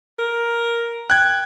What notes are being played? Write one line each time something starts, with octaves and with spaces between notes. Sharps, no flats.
A#4
G5 F#6 G#6